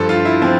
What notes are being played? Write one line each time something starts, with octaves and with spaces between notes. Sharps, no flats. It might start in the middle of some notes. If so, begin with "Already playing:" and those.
Already playing: G2 F3 A4 C5
F4
E4
F3 C4